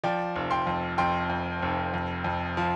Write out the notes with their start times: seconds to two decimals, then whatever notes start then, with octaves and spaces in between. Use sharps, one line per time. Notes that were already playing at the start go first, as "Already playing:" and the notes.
0.04 F3 D5 G5
0.36 F1
0.51 G5 C6
0.67 F2
0.98 F2 G5 C6
1.30 F2
1.62 F1
1.94 F2
2.24 F2
2.57 F3